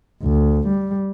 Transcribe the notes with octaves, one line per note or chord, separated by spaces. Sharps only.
D2
G3